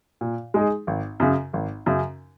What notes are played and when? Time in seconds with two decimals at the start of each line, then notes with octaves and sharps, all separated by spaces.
0.21 A#2
0.54 G#3 D#4 G#4
0.87 G#1
1.20 F#2 C#3
1.53 G#1
1.86 F#2 C#3